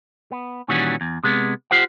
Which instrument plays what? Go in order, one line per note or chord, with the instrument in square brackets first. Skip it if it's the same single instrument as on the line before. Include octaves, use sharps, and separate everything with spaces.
[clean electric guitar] B3
A#2 D#3 E3 G3 C#4 F#4
E2
C3 G#3 B3
F4 G4 C5 F#5